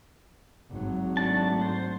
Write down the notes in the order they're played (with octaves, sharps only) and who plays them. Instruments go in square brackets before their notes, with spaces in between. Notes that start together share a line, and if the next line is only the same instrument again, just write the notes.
[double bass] G#1 F#3
[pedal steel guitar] A3 D4 A5
C5